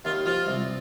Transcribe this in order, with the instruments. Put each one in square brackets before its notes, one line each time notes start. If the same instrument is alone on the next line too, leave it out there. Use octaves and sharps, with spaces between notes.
[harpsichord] D#2 [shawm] F4
[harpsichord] F3 [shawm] F4
[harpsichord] C2